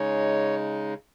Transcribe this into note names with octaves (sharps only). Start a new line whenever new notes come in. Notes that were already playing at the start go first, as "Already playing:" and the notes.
Already playing: C#3 G#3 D#4 C#5